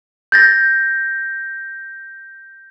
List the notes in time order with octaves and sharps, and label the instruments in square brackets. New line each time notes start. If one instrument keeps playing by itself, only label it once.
[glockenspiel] G6 A6 A#6